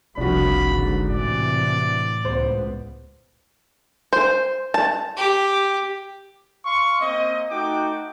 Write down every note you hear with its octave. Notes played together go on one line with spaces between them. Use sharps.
F#1 C2 C3 F3 D4 F#4 B5
G#2 D3
A2 C3 E3 D5
C#2 B3 C5
C5
A5
G4
F5 C6 C#6
A#3 C4 D#5
A3 D#4 F#4 G5 D6